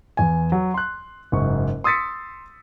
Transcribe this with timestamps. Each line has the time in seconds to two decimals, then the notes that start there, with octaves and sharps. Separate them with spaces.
0.17 E2 G#5
0.52 F#3
0.74 C6 F#6
1.32 F#1 G#2 C#6
1.84 C6 D#6 E6 A6 B6 C#7